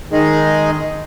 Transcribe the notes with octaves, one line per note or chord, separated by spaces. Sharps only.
D#3 G#3 D#4 G#4 D#5